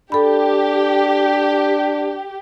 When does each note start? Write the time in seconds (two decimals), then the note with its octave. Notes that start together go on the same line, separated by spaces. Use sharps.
0.12 D4 G4 A4 B5